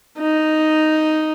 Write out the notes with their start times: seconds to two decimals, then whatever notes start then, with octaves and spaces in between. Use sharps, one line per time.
0.19 D#4